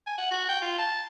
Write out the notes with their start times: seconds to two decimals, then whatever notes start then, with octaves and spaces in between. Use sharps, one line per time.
0.07 G#5
0.18 F#5
0.31 F#4
0.49 G5
0.62 F4
0.78 A5